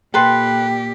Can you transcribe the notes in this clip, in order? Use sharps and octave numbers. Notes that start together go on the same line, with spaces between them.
A#2 G4 A4 B4 G5 C6